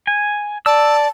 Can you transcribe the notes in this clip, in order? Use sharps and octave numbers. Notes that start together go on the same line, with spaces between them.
G#5
D5 A5 E6